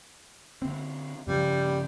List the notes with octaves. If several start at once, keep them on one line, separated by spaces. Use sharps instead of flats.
D3 C4
G2 C#3 F3 G3